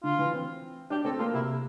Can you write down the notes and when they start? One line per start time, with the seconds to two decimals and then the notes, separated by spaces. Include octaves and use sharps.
0.04 D3 F4
0.19 E3
0.33 C4
0.90 D4 G4
1.05 C4 A4
1.19 A#3 F4
1.34 C3 E4